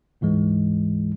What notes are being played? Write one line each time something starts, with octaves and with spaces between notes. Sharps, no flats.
D2 G#2 E3 G#3